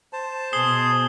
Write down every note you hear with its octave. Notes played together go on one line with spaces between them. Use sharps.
C5 A5
B2 G#4 D#6 C7 G7